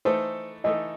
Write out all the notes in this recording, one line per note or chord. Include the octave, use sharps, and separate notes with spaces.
E3 A3 D#4 A4 C5
E3 A3 D#4 A4 D#5